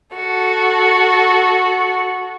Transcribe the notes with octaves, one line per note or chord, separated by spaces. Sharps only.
F#4 A4